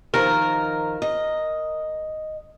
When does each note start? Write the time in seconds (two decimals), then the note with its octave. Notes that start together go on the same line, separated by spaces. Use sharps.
0.14 D#3 F3 A#4
1.02 D#5